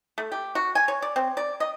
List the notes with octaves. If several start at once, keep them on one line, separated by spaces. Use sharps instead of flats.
A3
G4
F#4
G#5
C#5
D5
C4
D5
D#5